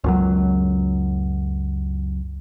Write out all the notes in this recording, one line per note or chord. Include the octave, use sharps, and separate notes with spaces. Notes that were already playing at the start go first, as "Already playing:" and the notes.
C#2 F#2 F#3